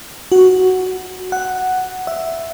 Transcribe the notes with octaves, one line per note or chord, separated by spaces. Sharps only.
F#4
F#5
E5